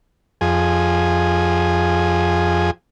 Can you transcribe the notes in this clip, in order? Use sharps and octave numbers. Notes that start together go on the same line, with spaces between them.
F2 G#4